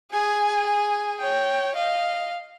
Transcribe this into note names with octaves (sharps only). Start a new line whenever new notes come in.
G#4 G#5
G#5
C#5 G5
D#5 F5